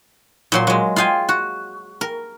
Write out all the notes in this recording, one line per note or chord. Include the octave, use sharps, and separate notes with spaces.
A#2 F#3 C6
F#3 G#3
F4 G#4 F5 G5 G#5
F#4
A#4